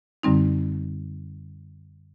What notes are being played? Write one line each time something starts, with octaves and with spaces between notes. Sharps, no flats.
F#2 D3 G3 C4 D#4